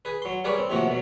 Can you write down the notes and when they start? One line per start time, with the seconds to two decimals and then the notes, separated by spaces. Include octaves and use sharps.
0.05 G#4 B4
0.22 F#3 C6
0.44 G3 G#4 A#4 B4 C#5 D5
0.58 C4
0.70 A2 C3 F3 A#3 F#4
0.87 B2 F#3